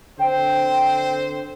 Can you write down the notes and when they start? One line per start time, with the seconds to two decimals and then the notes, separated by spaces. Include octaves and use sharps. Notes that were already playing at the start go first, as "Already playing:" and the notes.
0.19 D3 C4 C5 G5